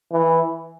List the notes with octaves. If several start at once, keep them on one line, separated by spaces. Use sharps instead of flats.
E3